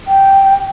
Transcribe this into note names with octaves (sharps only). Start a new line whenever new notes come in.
G5